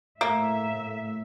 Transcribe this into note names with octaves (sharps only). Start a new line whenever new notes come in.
A2 A#3 E5